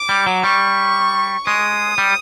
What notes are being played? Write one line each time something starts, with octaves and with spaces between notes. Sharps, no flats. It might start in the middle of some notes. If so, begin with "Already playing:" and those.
Already playing: D6
G3
F#3
G3 C#6
G#3 D#6
G3